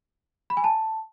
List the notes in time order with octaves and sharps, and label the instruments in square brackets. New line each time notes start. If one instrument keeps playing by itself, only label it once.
[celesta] B5
G#5
A5